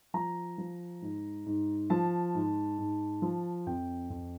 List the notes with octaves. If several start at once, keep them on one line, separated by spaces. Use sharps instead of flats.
F3 A#5
F3
G#2
G#2
F3 A5
G#2
G#2
F3
F2 G5
F2